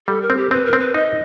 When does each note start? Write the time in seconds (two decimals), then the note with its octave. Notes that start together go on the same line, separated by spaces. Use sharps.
0.07 G3 A4
0.22 A#4
0.30 C4
0.37 G4
0.51 C4 B4
0.66 A#4
0.73 C4
0.80 B4
0.94 D#4 D#5